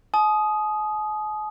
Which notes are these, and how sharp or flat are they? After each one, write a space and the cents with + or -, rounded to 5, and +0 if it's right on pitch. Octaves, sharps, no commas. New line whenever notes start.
G#5 +45 D#6 +0